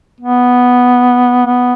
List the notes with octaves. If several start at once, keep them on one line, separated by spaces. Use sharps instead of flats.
B3
B3